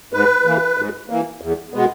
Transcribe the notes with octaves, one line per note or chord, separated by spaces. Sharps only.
G#2 B4
E3 A#3
G#2
E3 A#3
E2
B2 G#3 B3